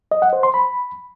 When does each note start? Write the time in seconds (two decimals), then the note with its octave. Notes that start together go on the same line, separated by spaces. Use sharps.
0.11 D#5
0.22 F#5
0.33 C5
0.43 C6
0.54 B5